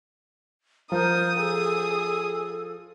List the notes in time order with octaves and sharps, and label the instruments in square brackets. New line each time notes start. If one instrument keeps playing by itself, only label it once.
[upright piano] F3 [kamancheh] A#4 [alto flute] C5 [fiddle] D#6
[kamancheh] G#4 [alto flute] A4